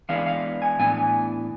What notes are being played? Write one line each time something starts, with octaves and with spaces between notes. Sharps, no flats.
E3 G#3 B3 D4 F5
F5
G#5
A2 E3 B3 D4 G#5